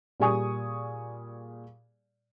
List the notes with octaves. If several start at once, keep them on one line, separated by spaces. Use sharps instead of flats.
A#2 G3 G#4 G#5 C#6 D#6